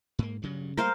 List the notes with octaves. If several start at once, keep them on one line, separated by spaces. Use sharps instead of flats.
G#2 A#3
G2 C#3 F#3
G3 A3 A#3 A#4 C5 F5